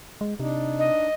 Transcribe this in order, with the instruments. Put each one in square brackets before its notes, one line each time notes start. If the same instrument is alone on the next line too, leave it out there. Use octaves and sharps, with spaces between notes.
[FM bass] G#3
[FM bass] C3 [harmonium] D4 D#4
[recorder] D#5